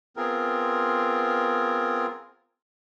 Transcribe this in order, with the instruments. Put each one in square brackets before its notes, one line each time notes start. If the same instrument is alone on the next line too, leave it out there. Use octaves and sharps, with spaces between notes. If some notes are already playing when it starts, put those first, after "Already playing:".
[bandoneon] B3 C4 F4 G#4 A#4